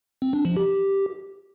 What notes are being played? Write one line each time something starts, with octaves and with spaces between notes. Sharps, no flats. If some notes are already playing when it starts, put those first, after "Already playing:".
C4
D4
F3
G4